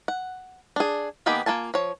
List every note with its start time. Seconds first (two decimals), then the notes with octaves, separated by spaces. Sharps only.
0.08 F#5
0.76 D4 G#4
1.26 D#3 A#3 B3 G4 G#4
1.46 A#3 F4 G#5 A5
1.74 F3 C#5